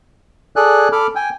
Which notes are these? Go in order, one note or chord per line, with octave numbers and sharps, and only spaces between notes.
G#4 A4 D5 G#5 F#6
A4 B5 D6 F6
G5 G#5